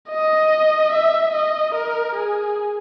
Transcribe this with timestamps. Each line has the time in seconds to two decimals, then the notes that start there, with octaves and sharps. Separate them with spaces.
0.09 D#5
0.92 E5
1.33 D#5
1.75 A#4
2.15 G#4